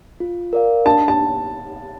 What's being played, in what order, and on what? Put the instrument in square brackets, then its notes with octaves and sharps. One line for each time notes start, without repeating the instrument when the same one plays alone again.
[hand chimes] F4
A#4 D5 F5
[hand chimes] D4 [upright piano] A5
[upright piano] A5